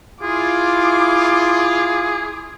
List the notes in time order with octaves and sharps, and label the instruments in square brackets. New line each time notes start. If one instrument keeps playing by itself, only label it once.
[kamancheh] E4 D6 [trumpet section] F4 [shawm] G#4